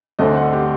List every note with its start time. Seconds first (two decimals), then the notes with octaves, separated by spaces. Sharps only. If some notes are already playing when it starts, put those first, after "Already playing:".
0.19 D2 D3 A3 C4 D#5
0.36 F#5
0.53 G4